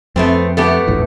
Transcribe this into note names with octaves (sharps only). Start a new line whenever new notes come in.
F2 A3 B3 C4
A3 B3 G4
A#1 E2 A2